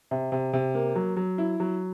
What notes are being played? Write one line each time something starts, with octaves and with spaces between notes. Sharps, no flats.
C3
C3
C3
A#3
F#3
F#3
E4
F#3